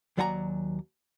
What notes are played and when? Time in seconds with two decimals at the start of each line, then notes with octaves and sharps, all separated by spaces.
0.17 D#2 F#3 D5 F#5 G#5 A#5